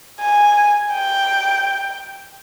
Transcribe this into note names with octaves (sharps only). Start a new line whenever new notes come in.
G#5
G5